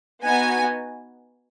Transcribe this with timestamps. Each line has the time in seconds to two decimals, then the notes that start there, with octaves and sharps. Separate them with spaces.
0.23 B3 D#4 F#4 G#5